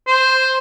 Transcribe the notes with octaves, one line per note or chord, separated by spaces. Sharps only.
C5